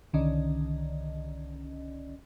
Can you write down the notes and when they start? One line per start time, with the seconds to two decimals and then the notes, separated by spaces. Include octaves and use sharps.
0.13 C2 D3 D#3 C#4 D5 D#5